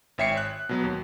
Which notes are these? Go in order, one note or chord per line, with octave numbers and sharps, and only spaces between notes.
G#1 C#5 E5 G5 C7 C#7
F#6
B2 F#3 B3
D#2